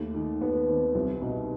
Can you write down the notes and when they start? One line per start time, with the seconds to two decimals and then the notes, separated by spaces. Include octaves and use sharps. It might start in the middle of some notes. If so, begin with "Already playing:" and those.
Already playing: D#2 A3
0.15 D#3
0.41 D#2 B3
0.54 B3
0.68 D#3 C4
0.95 C2 C4
1.22 B2 D#4